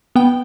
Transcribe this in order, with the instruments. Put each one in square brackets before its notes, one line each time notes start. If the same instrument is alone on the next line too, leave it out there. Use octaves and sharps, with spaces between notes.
[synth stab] B3 G5